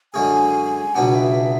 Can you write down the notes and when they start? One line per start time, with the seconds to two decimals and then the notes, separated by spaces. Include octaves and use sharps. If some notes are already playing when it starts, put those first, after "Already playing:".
0.14 F#2 D3 G#3 C#4 G#4 G#5
0.95 C#2 B2 F#3 B3 D4 F#5
1.15 E5